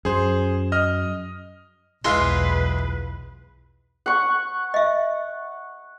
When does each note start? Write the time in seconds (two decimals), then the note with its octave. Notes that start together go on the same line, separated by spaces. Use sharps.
0.05 F#2 G#4 C5
0.72 D#5 D#6 F6
2.05 B1 E2 G#3 E4 F4 B4 C6
4.06 F#5 C#6
4.74 D#5 E5